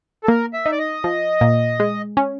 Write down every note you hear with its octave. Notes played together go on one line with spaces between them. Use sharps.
A4
A#3 A#4
E5
D#4
D5
D#5
F3
A#2
G#3
C#4